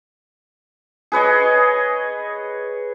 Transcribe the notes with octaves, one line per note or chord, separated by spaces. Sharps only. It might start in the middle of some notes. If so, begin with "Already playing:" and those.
G#4 B4 C#5 D#5